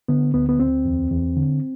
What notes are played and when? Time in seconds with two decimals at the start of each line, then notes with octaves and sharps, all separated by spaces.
0.08 D3 B3
0.34 D2 B3
0.49 B3
0.59 D2 C4
0.85 E2
1.11 E2
1.37 D3